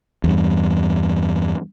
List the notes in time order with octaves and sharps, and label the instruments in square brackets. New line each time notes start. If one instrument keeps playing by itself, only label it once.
[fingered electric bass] E2 G2